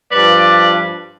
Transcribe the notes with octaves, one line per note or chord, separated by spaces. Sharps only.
G2 F3 B4 D5